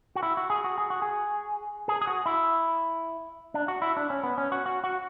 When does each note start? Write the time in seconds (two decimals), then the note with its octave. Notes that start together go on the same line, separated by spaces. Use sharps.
0.16 F#4
0.23 E4
0.37 F#4
0.50 G#4
0.64 F#4
0.78 G#4
0.90 F#4
1.02 G#4
1.88 G#4
2.01 G#4
2.07 F#4
2.26 E4
3.54 D4
3.68 F#4
3.82 E4
3.97 D4
4.10 C#4
4.23 B3
4.38 C#4
4.52 F#4
4.66 F#4
4.84 F#4